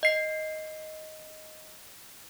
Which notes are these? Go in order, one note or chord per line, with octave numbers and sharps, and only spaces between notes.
D#5 C7